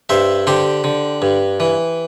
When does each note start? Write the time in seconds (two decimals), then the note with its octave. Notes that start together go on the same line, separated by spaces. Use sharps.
0.09 G2 C5 E5
0.47 D3 G4 C5
0.84 D3
1.22 G2
1.60 E3